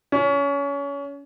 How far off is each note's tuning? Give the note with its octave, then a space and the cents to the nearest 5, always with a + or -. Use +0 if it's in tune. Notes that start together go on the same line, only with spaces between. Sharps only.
C#4 +25